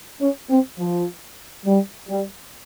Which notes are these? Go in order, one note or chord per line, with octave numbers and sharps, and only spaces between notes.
C#4
C4
F3
G3
G3